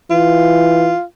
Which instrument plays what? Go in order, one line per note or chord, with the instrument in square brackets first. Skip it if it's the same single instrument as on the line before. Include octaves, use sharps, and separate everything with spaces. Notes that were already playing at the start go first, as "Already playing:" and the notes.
[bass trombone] E3 [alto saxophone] F4